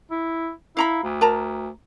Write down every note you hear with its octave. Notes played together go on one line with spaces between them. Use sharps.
E4
E4 F5 A#5 B5
D2
A#4 A5 A#5